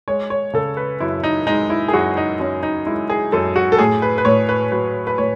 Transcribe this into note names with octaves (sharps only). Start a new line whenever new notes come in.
G#3 C#5
C#5
C#3 A4
B4
F#2 E4
D#4
G#3 D#4
E4
G#4
F#2 F#4
D#4
F#2 C#4
D#4
G#3 E4
G#4
F#2 A4
F#4
A4
A2 G#4
B4
B4
A2 C#5
B4
F#3 B4
B4
A2 C#5